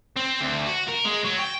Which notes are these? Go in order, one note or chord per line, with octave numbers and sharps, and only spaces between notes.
C4
D2
F#4
A#4
G#3
F#3
G5